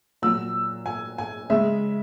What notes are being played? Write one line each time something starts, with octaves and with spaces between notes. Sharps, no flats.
A#2 F#3 E6
G#5
G#5
C#3 G#3 E5